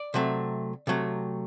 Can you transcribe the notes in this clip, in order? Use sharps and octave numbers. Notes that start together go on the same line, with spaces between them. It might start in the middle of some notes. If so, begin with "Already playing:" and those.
Already playing: D5
C3 F#3 A3
C3 F#3 A3